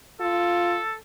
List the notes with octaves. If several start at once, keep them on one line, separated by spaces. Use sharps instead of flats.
F4 A4